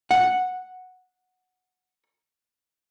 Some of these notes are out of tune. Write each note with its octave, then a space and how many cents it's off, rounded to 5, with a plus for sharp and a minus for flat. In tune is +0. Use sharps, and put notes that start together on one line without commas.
F#5 -5